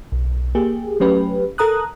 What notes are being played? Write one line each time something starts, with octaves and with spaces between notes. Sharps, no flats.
B1
A#3 G4 G#4
F#3 A3 C#4 G4 B4
A4 A#4 A#5 D#6 F#6